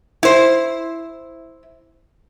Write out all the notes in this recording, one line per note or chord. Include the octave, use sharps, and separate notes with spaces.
E4 C5